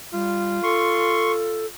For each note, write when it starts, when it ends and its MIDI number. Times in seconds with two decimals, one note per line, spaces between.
0.13 0.61 55
0.13 1.74 65
0.63 1.66 69
0.63 1.32 84
0.63 1.32 85